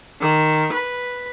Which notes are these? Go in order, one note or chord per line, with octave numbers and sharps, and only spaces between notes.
D#3
B4